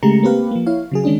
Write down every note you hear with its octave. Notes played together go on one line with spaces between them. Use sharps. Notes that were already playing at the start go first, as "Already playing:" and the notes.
C#3 G#3 A3 G4 A#5 C#7
A#3 C4 G4 B4 F5
F3 A#3
E4 C#5 F5
C#3 F#3 G#4
D#3 G#3 C#4 D4 G#4